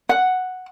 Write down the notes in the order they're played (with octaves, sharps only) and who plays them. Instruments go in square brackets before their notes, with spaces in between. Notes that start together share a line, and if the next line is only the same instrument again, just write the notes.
[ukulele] F#5